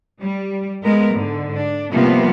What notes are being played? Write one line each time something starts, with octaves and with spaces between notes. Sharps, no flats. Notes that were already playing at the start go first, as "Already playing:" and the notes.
G3
G#3 B3 A#4
G#2 D3
D4
C3 F3 G3 A#3 B3